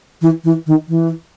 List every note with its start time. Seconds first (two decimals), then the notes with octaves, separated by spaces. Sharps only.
0.21 E3
0.44 E3
0.67 D#3
0.88 E3